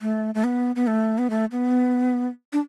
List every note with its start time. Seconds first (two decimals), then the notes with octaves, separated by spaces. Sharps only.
0.02 A3
0.35 A3
0.44 B3
0.76 B3
0.87 A3
1.18 B3
1.30 A3
1.52 B3
2.53 D4